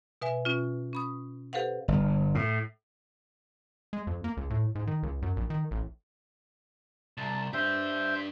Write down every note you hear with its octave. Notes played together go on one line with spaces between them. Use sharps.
B2 B4 E5 G#5
B2 C#4 F4
C#4 B5 D#6
G4 A4 B4 C5 F5 F#5
G1
A2
G#3
F2
A#3
C#2
A2
G#2
D#3
C#2
F#2
A#1
D#3
A1
C2 A5
D4 G4 C5 E5 G6